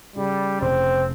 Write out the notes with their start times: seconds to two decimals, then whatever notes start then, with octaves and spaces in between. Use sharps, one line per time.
0.16 C#3 G3
0.61 F1 C4